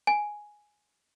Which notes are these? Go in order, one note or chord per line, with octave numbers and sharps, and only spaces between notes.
G#5